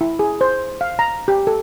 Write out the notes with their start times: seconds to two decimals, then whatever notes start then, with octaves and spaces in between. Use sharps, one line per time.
0.01 E4
0.19 G#4
0.41 C5
0.81 F5
0.99 A#5
1.28 G4
1.47 A4